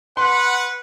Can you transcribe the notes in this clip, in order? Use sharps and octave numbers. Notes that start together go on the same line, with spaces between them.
B4 F#5 C6